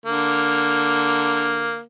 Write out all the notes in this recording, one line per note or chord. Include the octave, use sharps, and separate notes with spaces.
D3 A#3